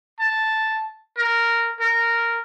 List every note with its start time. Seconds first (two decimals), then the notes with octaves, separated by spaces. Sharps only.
0.20 A5
1.17 A#4
1.80 A#4